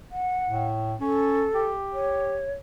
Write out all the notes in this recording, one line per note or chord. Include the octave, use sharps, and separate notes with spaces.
F#5
A2
C#4 A4
G4
C#5